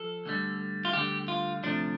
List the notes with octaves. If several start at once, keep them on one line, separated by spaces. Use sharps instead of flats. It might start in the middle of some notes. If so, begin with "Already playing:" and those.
Already playing: F3 A4
D2 D3 G3
F4
D2 D3 G3 G4
F4
D2 C3 F3 A3 D4